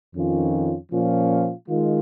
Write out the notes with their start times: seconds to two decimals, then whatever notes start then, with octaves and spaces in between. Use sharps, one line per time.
0.14 F2 D#3 C#4 F4
0.90 A#2 F3 C#4 F4
1.67 D#3 G#3 F4